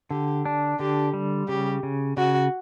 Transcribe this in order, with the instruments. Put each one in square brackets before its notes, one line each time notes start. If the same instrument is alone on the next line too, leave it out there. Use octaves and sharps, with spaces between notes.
[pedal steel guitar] D3 [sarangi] G4
[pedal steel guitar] D4
[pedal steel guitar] D3 [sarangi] G4
[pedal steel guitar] G3
[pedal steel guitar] C#3 [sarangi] G4
[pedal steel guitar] C#3
[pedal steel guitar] C#3 [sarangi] F#4